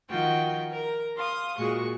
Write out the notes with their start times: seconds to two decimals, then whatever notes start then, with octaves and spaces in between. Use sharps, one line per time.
0.10 D#3 F3 F4 F#4 G5
0.71 A#4 A#5
1.16 F5 C6 D#6
1.57 A#2 G#3 F#4 C#6